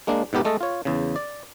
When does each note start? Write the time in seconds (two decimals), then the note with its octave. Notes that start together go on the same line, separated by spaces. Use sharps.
0.07 G#3 A#3 D4
0.33 G#2 B2 B3 G4 A#4
0.45 G#3 A3 A4 D#5
0.61 F4 C#5
0.85 E2 C#3
1.16 D5